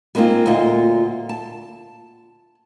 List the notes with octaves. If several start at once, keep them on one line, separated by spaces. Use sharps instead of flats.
G3 G#3 A#3 C4 D#4 F4
D2 A#2 A#3 F4 D#5
A5